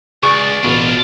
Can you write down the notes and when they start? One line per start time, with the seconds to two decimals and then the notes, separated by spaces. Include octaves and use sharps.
0.23 C#2 G#4 D5 C#6
0.64 A1 B2 D4 F4